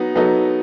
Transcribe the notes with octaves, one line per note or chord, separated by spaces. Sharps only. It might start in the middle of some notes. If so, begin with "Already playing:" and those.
Already playing: F#3 B3 D#4
F#3 B3 D#4 A4